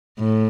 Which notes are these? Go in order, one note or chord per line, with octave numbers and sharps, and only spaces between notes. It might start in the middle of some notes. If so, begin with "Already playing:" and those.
A2